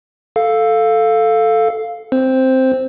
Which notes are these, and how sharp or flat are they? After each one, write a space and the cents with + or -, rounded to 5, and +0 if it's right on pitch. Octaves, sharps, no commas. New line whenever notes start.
A4 +0 F5 +0
C4 +0 C5 +0